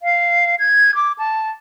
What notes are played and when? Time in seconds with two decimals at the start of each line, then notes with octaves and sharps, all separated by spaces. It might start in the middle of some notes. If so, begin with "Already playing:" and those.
0.01 F5
0.59 G#6
0.95 D6
1.18 A5